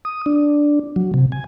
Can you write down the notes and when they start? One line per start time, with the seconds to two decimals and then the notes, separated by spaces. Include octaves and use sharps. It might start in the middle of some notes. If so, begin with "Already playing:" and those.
0.05 D#6
0.26 D4
0.96 F#3
1.14 C3
1.32 G#5